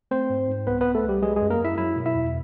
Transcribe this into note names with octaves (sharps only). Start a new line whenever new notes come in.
A3 C4 C5
G#2
G#2
C2 B3 B4
C2 B3 B4
A3 A4
C2 G3 G4
F#3 G#3 G#4
F#2 G#3 G#4
A#3 A#4
F#2
E4 E5
F#3 E4 E5
B2
E4 E5
E2